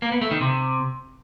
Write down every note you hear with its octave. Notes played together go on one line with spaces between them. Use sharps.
A#3
B3
A3
D#3
C3